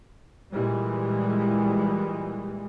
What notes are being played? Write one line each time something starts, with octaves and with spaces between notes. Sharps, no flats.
A#2 E3 G3 G#3